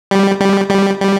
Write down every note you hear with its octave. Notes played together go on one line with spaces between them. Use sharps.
G3
G3
G3
G3